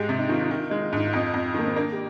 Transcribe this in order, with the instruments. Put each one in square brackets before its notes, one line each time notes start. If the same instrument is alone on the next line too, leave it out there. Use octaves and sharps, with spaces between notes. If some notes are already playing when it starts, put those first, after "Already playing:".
Already playing: [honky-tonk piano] G#2 G#3 [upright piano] G4 G#4
[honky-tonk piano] C3
[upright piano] D#4
[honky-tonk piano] D#3 [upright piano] F4
[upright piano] D#4
[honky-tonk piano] D#3
[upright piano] F4
[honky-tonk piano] G#3 [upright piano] D#4
[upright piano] F4
[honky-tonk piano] G#2 [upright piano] D#4
[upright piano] F4
[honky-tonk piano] F2
[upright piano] D#4
[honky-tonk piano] F2
[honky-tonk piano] D#3 [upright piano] A#3
[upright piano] C4
[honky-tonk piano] A#3 [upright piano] D4
[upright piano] G4